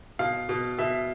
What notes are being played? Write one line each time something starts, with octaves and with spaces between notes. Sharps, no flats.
B2 F5
B2
B2 E5